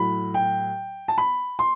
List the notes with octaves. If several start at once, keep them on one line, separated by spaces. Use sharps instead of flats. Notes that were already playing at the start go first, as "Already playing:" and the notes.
Already playing: A2 F#3 B5
G5
A5
B5
C6